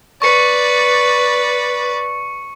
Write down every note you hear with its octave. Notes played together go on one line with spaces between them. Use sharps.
B4 D5 C#6 C#7